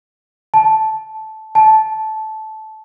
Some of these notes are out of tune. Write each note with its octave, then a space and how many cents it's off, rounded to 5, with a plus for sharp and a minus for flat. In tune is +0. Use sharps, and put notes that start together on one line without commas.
A5 -10
A5 -15